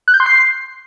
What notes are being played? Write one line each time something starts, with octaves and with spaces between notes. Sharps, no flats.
F#6
G6
C6
C7